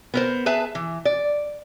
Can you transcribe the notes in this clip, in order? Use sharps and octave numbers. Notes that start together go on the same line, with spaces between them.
B3 A#4 C5
G#4 B4 E5 A5
E3
D5